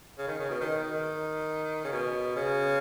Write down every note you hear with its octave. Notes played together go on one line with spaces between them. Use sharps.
C#3
D#3
C#3
B2
D#3
D#3
C#3
B2
C#3